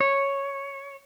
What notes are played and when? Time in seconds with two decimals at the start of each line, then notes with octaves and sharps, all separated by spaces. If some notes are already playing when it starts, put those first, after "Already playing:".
0.01 C#5